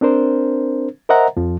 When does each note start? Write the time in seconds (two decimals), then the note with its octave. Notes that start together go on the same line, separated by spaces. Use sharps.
0.01 C4 D4 A#4 C5
1.09 A#4 C5 D#5 E5 F#5 A#5
1.37 F2 F3